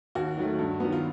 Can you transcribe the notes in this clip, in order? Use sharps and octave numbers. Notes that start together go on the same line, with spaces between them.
D#2 F#4
D#3 F#3 A3
G2
D#3 F#3 B3
F4